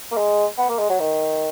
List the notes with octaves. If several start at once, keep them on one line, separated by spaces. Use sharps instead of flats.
A#3
G#3
B3
A#3
G#3
F#3
D#3